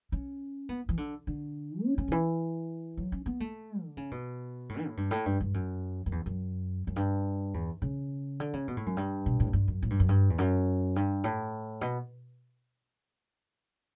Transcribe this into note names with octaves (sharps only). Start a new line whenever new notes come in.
C#4
B3
E3
D3
D3
C#4
C#4
D3
E3
F#3
C#4
B3
A3
D3
C#3
B2
A2
E3
A2
G2
A2
G2
G2
F#2
F#2
E2
F#2
F#2
G2
E2
C#3
D3
C#3
B2
A2
F#2
G2
B2
A2
G2
F#2
A2
G2
F#2
G2
E2
F#2
G2
A2
B2